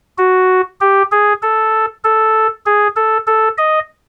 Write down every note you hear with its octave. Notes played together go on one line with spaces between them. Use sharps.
F#4
G4
G#4
A4
A4
G#4
A4
A4
D#5